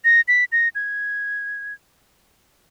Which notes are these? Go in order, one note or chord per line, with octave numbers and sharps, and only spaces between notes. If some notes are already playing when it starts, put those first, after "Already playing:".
A#6
B6
A#6
G#6